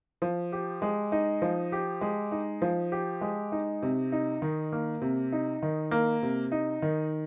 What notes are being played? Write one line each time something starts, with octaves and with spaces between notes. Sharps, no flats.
F3
G4
G#3
D#4
F3
G4
G#3
D#4
F3
G4
G#3
D#4
C3
D#4
D#3
A#3
C3
D#4
D#3
A#3
C3
D#4
D#3